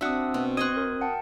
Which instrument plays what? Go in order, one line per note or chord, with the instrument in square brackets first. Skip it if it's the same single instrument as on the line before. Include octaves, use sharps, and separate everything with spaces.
[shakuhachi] C4 [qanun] D4 F#4 [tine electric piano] E5 F#5 [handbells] D#6 E6
[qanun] B2
[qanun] D#5 C6 C#6 [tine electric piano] D#6 F#6 [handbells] G#6
[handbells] A#4
F#5 G5 A5